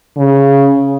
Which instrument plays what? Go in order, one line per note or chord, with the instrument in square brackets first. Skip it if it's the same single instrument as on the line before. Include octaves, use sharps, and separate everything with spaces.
[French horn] C#3